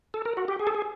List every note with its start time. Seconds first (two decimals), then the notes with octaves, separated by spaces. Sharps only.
0.14 A4
0.25 A#4
0.37 F#4
0.48 G4
0.59 G#4
0.67 A4
0.75 G#4